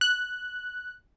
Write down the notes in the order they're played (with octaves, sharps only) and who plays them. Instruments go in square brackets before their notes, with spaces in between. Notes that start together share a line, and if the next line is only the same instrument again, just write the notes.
[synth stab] F#6